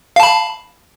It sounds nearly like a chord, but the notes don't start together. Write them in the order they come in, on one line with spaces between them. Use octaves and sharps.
F5 A5 B5